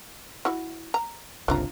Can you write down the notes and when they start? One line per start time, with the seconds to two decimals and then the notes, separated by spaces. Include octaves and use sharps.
0.45 E4 F#4
0.94 A#5
1.48 G1 C#2 C3 D4 F4 A#5